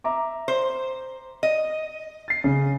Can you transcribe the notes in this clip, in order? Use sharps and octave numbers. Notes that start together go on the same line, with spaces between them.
E5 A#5 D6
C5
D#5
A6 C7
C#3